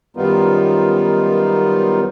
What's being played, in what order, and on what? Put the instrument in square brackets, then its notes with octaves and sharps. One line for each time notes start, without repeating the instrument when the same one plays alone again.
[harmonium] F#2 D#3 G3 B3 D#4 F4